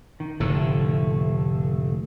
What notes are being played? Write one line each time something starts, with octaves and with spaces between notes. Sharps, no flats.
D#3
F1 A2 D3 A3